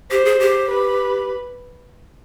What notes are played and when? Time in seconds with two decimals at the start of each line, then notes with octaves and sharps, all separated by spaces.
0.11 G4 C5
0.25 G#4
0.40 G4
0.70 B4